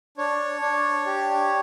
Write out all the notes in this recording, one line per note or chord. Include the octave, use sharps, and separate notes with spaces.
D4 C#5
D4
G4